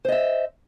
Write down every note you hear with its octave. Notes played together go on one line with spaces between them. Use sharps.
C5 D#5 E5